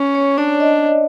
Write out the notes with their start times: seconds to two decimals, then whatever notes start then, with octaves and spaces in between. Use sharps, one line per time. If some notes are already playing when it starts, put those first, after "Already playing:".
Already playing: C#4
0.15 C#5
0.37 D4 D5
0.60 D#5